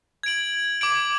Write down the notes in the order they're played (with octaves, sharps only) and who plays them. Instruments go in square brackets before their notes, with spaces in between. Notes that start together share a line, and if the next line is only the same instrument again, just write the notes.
[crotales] G#6 D7 F#7
D6 G#6 D7 F#7